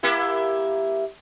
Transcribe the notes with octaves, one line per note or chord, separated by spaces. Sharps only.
A#3 E4 G4